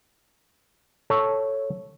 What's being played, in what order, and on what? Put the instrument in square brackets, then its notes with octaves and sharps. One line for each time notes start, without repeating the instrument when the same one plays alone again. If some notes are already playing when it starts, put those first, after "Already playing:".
[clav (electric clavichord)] A4 C#5